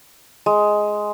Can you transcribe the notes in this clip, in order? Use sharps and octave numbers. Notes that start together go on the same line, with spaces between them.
G#3